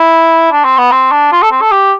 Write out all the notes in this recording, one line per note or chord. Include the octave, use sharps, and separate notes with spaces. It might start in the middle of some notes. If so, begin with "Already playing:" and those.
Already playing: E4
D4
C4
B3
C4
D4
F4
A4
C4
A4
G4